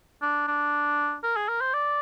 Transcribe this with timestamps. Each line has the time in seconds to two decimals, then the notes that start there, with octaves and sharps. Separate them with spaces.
0.22 D4
0.47 D4
1.23 A#4
1.36 G#4
1.48 A#4
1.61 C5
1.74 D5